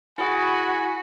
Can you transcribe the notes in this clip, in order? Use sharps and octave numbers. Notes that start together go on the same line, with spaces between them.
E4 F#4 G#4 G#5 B5